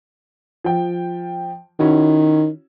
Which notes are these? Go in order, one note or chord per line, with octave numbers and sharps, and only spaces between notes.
F3 G5
D#3 C#4 E4 F#4